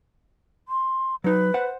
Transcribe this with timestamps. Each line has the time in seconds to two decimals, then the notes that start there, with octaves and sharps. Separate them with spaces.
0.68 C6
1.24 F#3 D#4 B4
1.54 C5 F#5